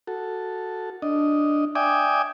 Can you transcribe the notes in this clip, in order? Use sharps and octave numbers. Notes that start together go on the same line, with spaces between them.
F#4 A4
D4 D#5
D5 E5 G5 G#5 D6 D#6